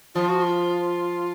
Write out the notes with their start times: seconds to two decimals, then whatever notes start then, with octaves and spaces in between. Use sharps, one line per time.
0.15 F3 F4
0.29 F#4
0.42 F4